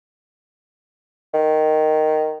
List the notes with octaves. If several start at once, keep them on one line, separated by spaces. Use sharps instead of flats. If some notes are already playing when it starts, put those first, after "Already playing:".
D#3